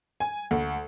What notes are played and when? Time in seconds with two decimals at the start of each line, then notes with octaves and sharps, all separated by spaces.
0.20 G#5
0.51 D2